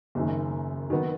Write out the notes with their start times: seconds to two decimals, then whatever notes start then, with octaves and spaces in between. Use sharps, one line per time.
0.15 F#1 F#2 D#3
0.90 D#3 F#3 B3 D#4